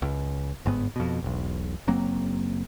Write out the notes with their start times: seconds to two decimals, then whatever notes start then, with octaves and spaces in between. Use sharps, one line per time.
0.02 C#2
0.66 G1 G#2 B3
0.96 F2 B2
1.22 E1 B1
1.87 F#1 F#3 A#3 C4